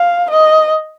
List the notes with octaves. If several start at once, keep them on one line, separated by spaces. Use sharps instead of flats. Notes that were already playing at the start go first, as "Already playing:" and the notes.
Already playing: F5
D#5